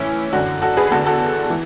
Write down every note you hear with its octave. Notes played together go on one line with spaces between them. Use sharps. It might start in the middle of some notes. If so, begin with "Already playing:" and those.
Already playing: A2 E3 C#4 E4
F#2 D3 D4 F#4
F#4 A4
G#4 B4
E2 D3 F#4 A4
F#4 A4
E3